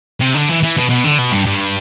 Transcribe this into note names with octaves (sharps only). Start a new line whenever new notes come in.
C3
D3
E3
E3
B2
B2
D3
B2
G2
G2